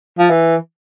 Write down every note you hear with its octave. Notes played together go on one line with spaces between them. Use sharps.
F3
E3